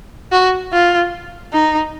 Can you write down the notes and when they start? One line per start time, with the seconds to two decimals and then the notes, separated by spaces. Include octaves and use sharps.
0.32 F#4
0.72 F4
1.53 D#4